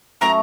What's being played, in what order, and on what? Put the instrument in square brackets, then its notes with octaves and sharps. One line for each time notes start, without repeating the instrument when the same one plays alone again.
[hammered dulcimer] F#3 A3 C#4 [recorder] A#5